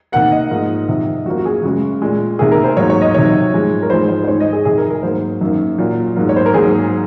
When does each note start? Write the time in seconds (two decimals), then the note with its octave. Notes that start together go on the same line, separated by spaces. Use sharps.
0.12 C3 D#3 A#3 F#5
0.32 D#5
0.50 G#2 F3 A#3
0.89 F2 C3 D#3
1.25 F#2 F3 A#3 F#4
1.37 F#4
1.45 G#4
1.63 F#2 C#3 G#3 F#4
2.02 A#2 G#3
2.39 C3 D#3 A#3 G#4
2.52 A#4
2.64 C5
2.77 G#2 F#3 A#3 C#5
2.90 C#5
3.02 D#5
3.14 C3 D#3 F#3 C#5
3.52 G#2 F3 G#3
3.82 A#4
3.90 G#2 F3 G#3 C5
4.08 C5
4.24 C5
4.28 G#2 D#3 G#3 C#5
4.40 D#5
4.53 G#4
4.65 F2 C3 D#3 G#4
4.78 A#4
4.90 A#4
5.03 G#2 F#3 A#3 C5
5.41 F#2 D#3 A#3
5.78 A#2 F#3 A#3
6.16 G#2 F#3 A#3
6.29 C#5
6.36 C5
6.46 A#4
6.54 G#2 F#3 A#3 G#4